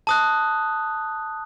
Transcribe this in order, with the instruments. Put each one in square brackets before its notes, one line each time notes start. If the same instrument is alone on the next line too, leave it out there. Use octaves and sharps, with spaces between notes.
[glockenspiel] A5 D#6 F#6